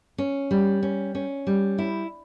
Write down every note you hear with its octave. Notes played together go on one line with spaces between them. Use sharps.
C#4
G3
C#4
C#4
G3
E4